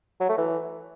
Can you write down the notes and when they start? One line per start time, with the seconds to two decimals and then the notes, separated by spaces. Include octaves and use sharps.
0.21 F#3
0.29 A3
0.38 E3